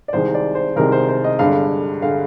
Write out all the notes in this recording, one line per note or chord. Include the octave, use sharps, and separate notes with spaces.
D5
C2 C3 D#3 G#3 C5
D5
C5
C2 C3 D#3 G#3 A#4
C5
C5
D#5
G1 G2 D3 G#3 F5
D3 G#3 F5